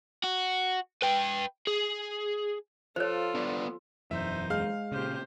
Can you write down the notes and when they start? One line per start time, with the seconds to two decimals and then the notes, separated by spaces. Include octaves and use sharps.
0.24 F#4
1.02 B4 G5
1.67 G#4
2.96 F3 F4 A4 C5 C#5
3.35 B3 D4
4.11 E1 F#2 E3 D#4 C5 E5
4.50 G#3 F5 F6
4.92 A#2 C#3 G4 C5